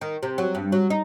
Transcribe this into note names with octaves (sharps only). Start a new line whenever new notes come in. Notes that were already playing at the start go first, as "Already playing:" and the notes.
D#3
C3
F#3
G2
F#3
D#4